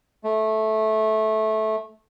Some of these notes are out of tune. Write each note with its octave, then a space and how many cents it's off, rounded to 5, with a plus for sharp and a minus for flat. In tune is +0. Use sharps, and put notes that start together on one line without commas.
A3 -15